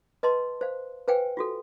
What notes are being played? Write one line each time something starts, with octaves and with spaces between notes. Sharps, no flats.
B4 D#5 A5 C6
C5 F5
B4 C5 F5 G5 G#5
F4 F#4 A4